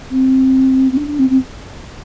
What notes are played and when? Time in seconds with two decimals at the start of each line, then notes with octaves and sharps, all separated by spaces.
0.10 C4
0.92 C4
0.97 D4
1.08 D4
1.19 C4
1.30 C4